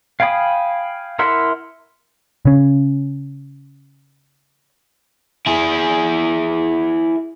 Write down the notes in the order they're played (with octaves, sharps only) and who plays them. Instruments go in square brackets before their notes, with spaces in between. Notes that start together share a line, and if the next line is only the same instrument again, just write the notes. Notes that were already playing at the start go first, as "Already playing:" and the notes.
[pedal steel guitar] F5 G5 G#5 B5 D#6
E4 A#4 E5 F#5 C6
[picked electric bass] C#3 C#4
[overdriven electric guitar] E4 G#4